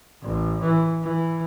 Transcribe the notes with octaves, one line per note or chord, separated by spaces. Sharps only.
A1
E3
E3